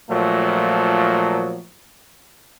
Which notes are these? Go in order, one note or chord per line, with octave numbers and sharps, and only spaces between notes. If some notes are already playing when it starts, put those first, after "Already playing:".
A#2 F3 F#3 A3